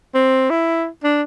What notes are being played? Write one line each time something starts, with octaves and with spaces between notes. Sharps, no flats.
C4
E4
D4